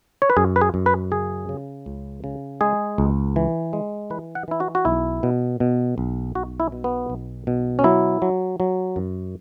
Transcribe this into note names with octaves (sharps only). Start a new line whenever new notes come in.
C#5
B4
F#2 G#4
B4
G#4
F#2
B4
C#3 G#4
C#3
C#2
C#3
G#3 G#4
C#2
E3
G#3
E3 B4
F#5
E3 E4
F#4
F#4
B1 E4
B2
B2
B1
B1 F#4
E4
B2
B3
B1
B2
C#4
F#3 E4
F#3
F#3
F#2